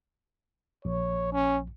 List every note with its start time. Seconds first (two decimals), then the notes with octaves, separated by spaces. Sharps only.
0.85 A#1 C#5
1.33 C#4